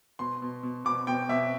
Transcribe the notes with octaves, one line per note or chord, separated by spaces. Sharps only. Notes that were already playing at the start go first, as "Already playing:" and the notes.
B2 C6
B2
B2
B2 D6
B2 G5
B2 E5